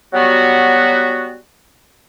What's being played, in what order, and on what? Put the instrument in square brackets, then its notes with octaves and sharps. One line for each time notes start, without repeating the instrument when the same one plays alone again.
[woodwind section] F#3 G3 B3 F#4